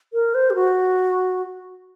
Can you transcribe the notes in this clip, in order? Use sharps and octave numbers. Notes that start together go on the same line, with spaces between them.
A#4
C5
G4
F#4